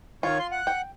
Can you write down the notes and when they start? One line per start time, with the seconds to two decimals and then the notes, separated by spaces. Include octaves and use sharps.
0.23 D#3 F4 C#5
0.39 C6
0.52 F#5
0.67 G5